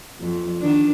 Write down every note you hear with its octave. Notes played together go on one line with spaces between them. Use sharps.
F2
D#3 D4